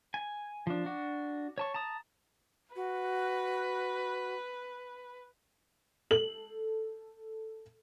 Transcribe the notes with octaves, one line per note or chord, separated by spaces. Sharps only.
G#5
F3 D4
D4 F#4
C#5 A5 C#6
A5 A#5 D#6
F#4 B4
A4 F#7